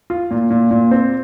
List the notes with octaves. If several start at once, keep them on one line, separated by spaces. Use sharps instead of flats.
F4
A#2
A#2
A#2
C4